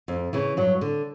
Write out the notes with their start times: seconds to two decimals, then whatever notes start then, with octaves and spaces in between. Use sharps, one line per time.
0.08 F2
0.33 C#3 E3
0.57 G2 F#3
0.81 D3